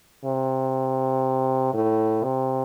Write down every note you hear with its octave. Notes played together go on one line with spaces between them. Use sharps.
C3
A2
C3